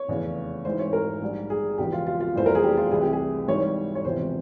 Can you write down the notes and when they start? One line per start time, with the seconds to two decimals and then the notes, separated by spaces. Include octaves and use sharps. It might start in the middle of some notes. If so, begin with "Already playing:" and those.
Already playing: C#5
0.08 F1 E2 C#3
0.65 G#1 G#2 E3 C5
0.79 C#5
0.93 A#4
1.22 A#1 G#2 G3
1.50 G#4
1.78 E1 E2 C#3 F3 G4
1.92 F4
2.07 F4
2.20 F4
2.35 F1 E2 E3 G3 C5
2.46 A#4
2.55 G#4
2.63 G4
2.77 F4
2.91 C2 C3 E3 G#4
3.01 G4
3.13 G#4
3.48 G#1 G#2 E3 G3 C#5
3.95 C#5
4.05 E1 E2 C3 F3 C5